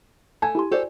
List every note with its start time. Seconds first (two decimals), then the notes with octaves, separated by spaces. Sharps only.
0.42 A3 G#5 A5 G#6
0.55 E4 G4 C6
0.72 F#4 G4 A4 C5 D5